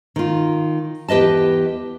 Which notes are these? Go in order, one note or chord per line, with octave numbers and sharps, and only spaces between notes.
D#3 F4
E2 G4 B4 D#5 A5